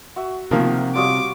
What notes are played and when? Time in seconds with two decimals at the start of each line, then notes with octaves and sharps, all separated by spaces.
0.16 F#4 E5
0.51 C3 D#3 F3 A#3
0.95 G3 F4 F#4 C#5 D6 D#6